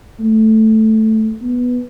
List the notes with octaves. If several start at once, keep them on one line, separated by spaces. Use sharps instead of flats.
A3
B3